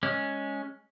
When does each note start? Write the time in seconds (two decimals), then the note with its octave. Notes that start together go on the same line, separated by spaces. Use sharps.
0.03 G#3 C#4